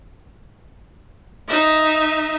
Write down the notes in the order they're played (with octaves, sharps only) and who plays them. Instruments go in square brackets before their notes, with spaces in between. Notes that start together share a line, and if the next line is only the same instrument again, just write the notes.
[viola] D#4 E5